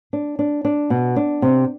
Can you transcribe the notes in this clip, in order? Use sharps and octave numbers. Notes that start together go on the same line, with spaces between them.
D4
D4
D4
B2
D4
C3